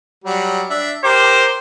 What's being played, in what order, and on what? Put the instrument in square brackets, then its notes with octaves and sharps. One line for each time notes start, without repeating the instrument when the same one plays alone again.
[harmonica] F#3 G3
D4 E5
[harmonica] G4 A#4 D6 [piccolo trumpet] C5